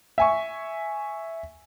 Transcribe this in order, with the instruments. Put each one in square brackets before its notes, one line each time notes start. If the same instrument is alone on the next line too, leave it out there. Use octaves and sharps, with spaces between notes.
[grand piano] E5 G#5 C#6